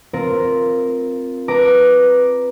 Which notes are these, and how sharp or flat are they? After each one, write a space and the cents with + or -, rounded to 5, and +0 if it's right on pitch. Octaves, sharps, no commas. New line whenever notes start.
C4 +0 F4 +0 A#4 +0
B4 +0 A#5 +5 D6 +0